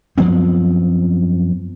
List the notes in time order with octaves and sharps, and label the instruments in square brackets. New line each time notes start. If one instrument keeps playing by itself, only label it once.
[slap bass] F#2 F3 B3 C4